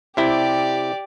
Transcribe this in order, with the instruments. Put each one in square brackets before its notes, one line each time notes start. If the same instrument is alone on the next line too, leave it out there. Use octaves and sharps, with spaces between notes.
[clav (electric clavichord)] C3 E4 G5 [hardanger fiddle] G4 D5